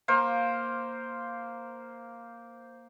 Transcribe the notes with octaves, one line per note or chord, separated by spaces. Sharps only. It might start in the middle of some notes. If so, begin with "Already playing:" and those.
A#3 C5 F5